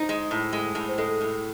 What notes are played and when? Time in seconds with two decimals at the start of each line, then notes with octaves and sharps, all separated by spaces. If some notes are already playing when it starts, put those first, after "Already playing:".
Already playing: D#4 C5
0.09 G#3
0.31 A2
0.53 G#3
0.75 A2
0.89 C5
0.98 G#3 A4
1.21 A2